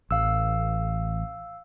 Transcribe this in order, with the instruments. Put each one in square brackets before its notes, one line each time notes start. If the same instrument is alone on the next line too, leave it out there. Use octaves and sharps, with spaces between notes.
[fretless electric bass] A1 [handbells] F5 E6